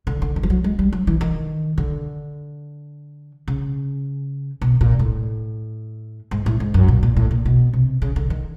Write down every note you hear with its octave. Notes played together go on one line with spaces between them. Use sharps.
D3
D3
D#3
F3
F#3
G#3
G3
F#3
E3
D#3
D3
C#3
B2
A#2
A2
G#2
A2
G#2
F#2
A#2
A#2
A2
A#2
B2
C3
C#3
D3
D#3